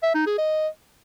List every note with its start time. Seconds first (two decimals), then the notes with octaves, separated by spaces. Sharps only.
0.03 E5
0.15 D#4
0.26 G#4
0.38 D#5